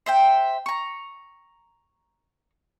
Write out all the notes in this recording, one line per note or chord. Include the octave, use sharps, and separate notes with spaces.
C5 E5 G5
A#5 C#6